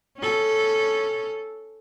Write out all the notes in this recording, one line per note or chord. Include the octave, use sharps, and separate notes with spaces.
C#4 A4